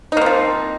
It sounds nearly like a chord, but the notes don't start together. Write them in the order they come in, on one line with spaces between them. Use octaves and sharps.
D#4 A#3 C4 F3